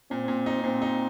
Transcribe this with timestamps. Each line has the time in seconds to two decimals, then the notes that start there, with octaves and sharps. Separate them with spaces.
0.11 A#2 C4
0.28 A#2
0.46 D#4
0.64 A#2 C4
0.82 D#4